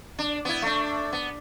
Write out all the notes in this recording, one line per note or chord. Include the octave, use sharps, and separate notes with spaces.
D4
B3 E4
A3 D4
B3